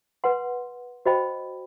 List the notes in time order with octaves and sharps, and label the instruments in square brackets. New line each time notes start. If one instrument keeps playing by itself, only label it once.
[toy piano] B4 F#5 C6
F#4 C5 D#5 G5 B5